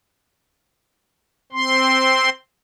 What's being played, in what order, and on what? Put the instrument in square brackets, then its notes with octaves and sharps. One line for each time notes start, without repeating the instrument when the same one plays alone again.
[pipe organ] C4 C6